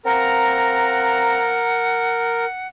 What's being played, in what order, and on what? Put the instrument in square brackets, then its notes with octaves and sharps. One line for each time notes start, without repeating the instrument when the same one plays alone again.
[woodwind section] C4 F5 A#5 [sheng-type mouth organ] A#4 [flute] F#5